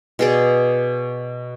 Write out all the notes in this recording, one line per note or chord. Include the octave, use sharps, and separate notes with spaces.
B2 G#4 D5